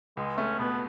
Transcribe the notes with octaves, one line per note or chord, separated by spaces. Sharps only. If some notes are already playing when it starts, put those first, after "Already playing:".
C#2 G#3
A3 C#4
B2 B3